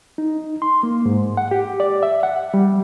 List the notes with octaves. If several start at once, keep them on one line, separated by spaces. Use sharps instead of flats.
D#4
C6
A#3
G#2
F#5
G4
D5
E5
F#5
G3